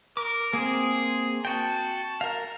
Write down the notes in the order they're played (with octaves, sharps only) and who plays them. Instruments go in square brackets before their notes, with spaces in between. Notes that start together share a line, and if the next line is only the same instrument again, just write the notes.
[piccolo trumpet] A#4 [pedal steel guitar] D6
[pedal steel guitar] A#3 C4 [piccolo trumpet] G#4
[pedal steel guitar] F#4 G5 [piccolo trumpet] A5
[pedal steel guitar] A#4 F5